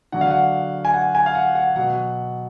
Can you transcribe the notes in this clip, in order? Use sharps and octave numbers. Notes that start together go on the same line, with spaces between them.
D3 F#3 F#5
F5
F#5
G#5
F#5
G#5
F5
F#5
F#5
B2 F#3 F#5